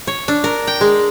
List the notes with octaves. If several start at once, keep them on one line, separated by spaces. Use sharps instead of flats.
C#5
D4
A#4
G5
G#3